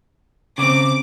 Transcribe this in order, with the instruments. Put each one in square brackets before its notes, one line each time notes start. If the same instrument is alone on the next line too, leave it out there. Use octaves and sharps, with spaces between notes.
[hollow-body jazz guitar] C#3 C4 [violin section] D6